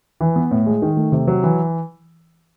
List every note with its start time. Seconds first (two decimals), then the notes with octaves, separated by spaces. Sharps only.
0.21 E3
0.36 B3
0.51 A2
0.66 G#3
0.82 D#3
0.97 A3
1.12 C3
1.27 F#3
1.43 E3